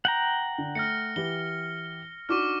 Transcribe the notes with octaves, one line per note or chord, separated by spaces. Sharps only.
F#5 G5 A#5
D3
A3 F6 A#6 C#7
E3 E4 G4 G7
D4 D#4 F#4 C#6 D6 F6